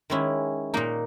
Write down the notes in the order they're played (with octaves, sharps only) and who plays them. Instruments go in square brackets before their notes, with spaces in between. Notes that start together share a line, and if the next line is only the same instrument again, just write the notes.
[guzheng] D#3 G#3 C#4 E4
A#2 A#3 D#4